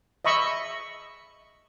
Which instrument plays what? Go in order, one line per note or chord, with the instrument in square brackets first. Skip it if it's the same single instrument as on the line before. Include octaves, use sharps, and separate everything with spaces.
[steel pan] D#5 E5 B5 C#6